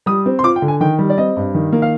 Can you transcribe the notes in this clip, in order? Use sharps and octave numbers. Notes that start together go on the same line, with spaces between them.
G3 D#6
C4
C6
F4 D6
G5
D3
G#5
D#3 G5
G3
D5
C4 D#5
G2
D#3
A#3
F5